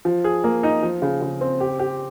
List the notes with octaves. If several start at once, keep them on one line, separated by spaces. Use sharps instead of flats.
F3
G#4
A#3
D#4
F3
C#3
C#3
C4
G4
G4